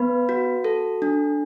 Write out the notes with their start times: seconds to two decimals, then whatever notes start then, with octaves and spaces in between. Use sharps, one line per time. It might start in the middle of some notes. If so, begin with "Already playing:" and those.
Already playing: B3 B4 B5
0.29 F#4
0.64 A4
1.02 D4